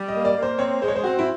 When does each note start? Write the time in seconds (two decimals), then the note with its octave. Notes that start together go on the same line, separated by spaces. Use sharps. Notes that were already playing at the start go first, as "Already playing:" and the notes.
Already playing: G3
0.08 D#5
0.14 A#3
0.25 D5
0.37 A#3
0.43 C5
0.59 C4 C#5
0.82 G#3 C5
0.88 C#5
0.96 C5
1.04 C4 F#4
1.19 E4